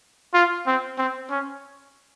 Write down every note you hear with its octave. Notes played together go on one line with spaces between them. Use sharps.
F4
C4
C4
C#4